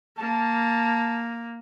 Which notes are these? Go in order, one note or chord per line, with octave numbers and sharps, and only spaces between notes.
A#3 A5